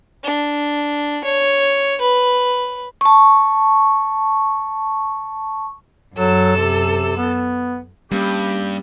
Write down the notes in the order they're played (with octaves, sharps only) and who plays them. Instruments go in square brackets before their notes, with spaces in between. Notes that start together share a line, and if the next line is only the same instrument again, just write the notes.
[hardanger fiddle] D4
C#5
B4
[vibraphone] A5 C#6
[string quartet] F#2 A4 E6 [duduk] F#3
[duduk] C3
B3
[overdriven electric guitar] G2 [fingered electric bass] G3 A#3 C#4 [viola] G4